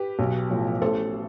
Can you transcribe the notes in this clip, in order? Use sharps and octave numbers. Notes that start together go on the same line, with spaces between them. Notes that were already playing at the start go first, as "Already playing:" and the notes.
Already playing: G4 B4
B1
A2 F3
A1 A4 C5